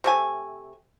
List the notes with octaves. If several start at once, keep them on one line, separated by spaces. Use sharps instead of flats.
C3 A3 G#5